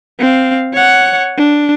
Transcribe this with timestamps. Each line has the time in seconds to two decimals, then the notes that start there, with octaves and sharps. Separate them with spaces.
0.19 C4 F5
0.74 C#5 F#5
1.37 D4